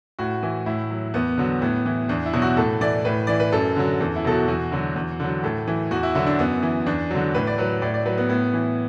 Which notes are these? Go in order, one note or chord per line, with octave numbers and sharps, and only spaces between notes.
A2 F#4
E3
A2 E4
F#3
E2 B3
D3 F#3
A2 B3
E3
E2 D4
E4
B2 F#3
F#4
A2 A4
E3 D5
A2 B4
E3 D5
B4
F#2 A4
D3 F#3
E2 A4
E4
B2 F#3 A4
F#4
E2 F#4
D3 F#3
E2
D3 F#3
A2 A4
E3
E2 F#4
E4
D3 F#3 E4
D4
F#2 B3
E3
E2 D4
D3 F#3
A2 B4
D5
F#3 B4
A2 D5
D5
F#3 B4
B3
A2 B3
E3